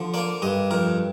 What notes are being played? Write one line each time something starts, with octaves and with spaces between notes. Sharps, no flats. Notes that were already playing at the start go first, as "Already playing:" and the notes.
Already playing: D3 F3
A#3 D5
G2 D#5
F2 A#4